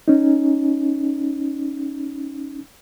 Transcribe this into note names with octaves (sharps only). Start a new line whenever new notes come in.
C#4 D#4